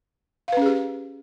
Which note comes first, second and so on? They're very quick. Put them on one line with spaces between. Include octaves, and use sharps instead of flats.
F5 B4 C#4 G#4 G4